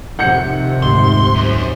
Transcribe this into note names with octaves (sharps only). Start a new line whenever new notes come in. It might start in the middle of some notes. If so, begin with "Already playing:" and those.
F2 C3 D#3 F#5 G6 C#7
D2 G#2 C6
F#2